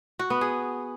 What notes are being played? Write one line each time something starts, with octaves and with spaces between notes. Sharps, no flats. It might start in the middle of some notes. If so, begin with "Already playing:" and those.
F#4
B3
G#4